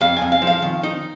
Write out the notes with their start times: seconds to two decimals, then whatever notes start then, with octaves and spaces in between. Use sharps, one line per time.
0.01 F2 F5
0.17 F2 G#5
0.32 F5
0.42 F3
0.47 F5
0.62 D#3
0.83 D#4